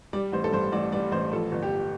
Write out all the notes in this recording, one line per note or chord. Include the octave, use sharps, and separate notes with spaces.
G3 D5
A1 C5
A4
G2 C5
A1 D5
G3 D5
A1 C5
F3 A4
G1
G4